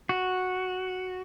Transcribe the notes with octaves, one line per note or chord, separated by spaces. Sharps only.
F#4